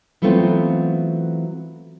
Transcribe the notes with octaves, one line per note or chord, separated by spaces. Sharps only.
E3 F#3 A3 B3 C4 F4